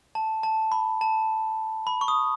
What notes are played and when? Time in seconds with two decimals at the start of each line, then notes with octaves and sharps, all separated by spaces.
0.15 A5
0.43 A5
0.72 B5
1.01 A5
1.87 B5
2.01 C#6
2.08 D#6